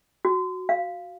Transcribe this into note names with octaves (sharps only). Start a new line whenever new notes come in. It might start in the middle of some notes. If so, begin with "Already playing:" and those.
F#4
F5